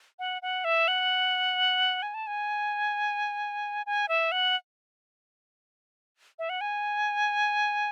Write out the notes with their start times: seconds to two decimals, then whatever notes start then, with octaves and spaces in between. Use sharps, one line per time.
0.19 F#5
0.42 F#5
0.64 E5
0.88 F#5
2.02 G#5
2.14 A5
2.27 G#5
3.86 G#5
4.09 E5
4.32 F#5
6.39 E5
6.49 F#5
6.61 G#5